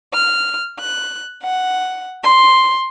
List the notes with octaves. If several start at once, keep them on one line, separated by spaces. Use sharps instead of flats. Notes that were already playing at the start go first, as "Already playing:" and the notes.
F6
F#6
F#5
C6